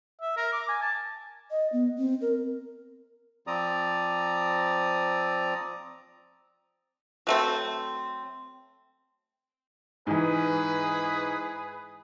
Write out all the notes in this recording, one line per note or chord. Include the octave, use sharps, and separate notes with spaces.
E5
A#4
D6
G#5
A5
D#5
B3
C4
A#4
F3 C4 D5 A#5 D#6
F#3 A3 C4
G#2 E3 G#4 B4